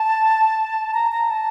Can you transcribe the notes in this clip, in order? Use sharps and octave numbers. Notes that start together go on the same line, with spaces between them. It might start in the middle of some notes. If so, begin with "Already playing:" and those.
Already playing: A5
A#5
A#5
A5